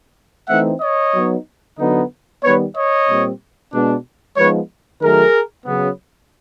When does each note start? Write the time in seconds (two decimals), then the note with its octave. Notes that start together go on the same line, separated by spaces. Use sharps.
0.49 E3 A3 C4 D#4 E5 F#5
0.81 C#5 D#5
1.14 F#3 B3 D#4
1.78 D3 F#3 B3 D#4
2.42 D#3 G3 B3 B4 C#5
2.76 C#5 D#5
3.07 A#2 G3 C4
3.72 B2 G#3 B3 D4
4.37 F3 G#3 B3 D#4 B4 C#5
5.01 D#3 F#3 A3 G#4 A#4
5.66 C#3 F#3 B3